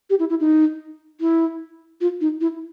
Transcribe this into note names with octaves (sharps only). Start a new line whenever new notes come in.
G4
E4
E4
D#4
E4
F4
D#4
E4